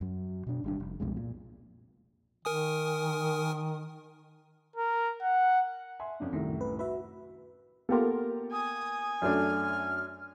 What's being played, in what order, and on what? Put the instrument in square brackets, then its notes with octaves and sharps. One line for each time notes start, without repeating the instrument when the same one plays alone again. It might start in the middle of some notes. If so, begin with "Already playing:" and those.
[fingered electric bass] F#2 F#3
B2 D4
G#1 G3 D4
F1
C2 F2 B2 G#3
A#2
[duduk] D#3 [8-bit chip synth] A#4 G#5 D#6
[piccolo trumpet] A#4
F#5
[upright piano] E5 G#5 C6
F2 C#4 D4
[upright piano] C2 F#2 A2 [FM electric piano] D#3
[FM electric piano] B4
[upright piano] F#4 B5 [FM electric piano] B4 E5
[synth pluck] A#3 B3 A#4 [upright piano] F4 G4 A4
[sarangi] G#5 [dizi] D#6
[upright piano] F#2 A3 D4 [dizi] F6